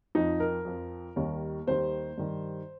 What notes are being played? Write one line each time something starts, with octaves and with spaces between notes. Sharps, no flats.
F2 F3 D#4
A#4
F2 F3
D#2 D#3 G3
D#2 D#3 G3 C5
G2 D#3 G3